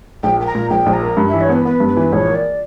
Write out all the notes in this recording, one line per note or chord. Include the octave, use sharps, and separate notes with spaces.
A#1 G5
A#3 G5
A#5
A#2
A#1 G5
A#1
A#5
A#3
G2
E3 E5
C#5
B3 B4
B3 B4
G2
B4
E3
A#1 C#5
A#3
D5